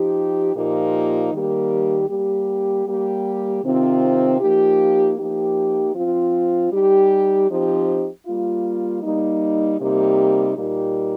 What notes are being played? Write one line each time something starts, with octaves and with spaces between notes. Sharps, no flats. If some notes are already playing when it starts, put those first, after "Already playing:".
Already playing: F3 D#4 G4
A#2 F3 A#3 D#4 G4
D#3 G3 A#3 G4
G3 A#3 G4
G3 A#3 G4
C3 D#3 C4 F4
F3 A#3 D#4 G4
F3 A#3 D#4 G4
F3 C4 F4
G3 D#4 G4
F3 C4 D#4 G4
G3 A#3 F4
G3 A#3 D#4
C3 G3 A#3 D#4 G4
A#2 G3 A#3 D#4 G4